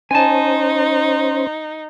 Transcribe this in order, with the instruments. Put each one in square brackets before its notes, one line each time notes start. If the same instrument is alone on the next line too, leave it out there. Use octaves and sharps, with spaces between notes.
[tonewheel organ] C#4 C5 [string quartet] D#4 [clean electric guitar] G#5 A5